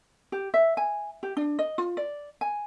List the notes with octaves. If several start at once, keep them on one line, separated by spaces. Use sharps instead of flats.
G4
E5
G#5
G4
D4
D#5
F4
D5
G#5